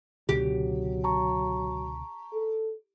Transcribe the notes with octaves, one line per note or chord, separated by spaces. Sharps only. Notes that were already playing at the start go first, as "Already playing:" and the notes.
C#2 B2 D3 F#3 G4
A5 A#5 C#6
A4